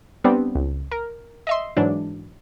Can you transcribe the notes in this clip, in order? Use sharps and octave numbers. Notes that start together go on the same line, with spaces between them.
G3 B3 C4 D4
C#2
A#4
D#5 E5 C6
G#2 E3 F#3 D4